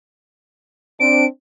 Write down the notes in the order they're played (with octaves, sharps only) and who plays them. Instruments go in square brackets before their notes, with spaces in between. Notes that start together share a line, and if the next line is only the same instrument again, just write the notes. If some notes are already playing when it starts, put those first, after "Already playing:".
[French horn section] C4 D4 [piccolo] D7